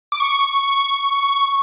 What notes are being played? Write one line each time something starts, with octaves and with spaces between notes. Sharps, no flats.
D6
C#6